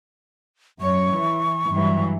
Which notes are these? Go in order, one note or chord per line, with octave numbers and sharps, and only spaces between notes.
F#2 C#5 C#6
E3
G2 E3 F#3